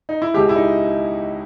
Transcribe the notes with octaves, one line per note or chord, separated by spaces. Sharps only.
D#4
E4
C#2 B2 G#3 G4
E4
D#4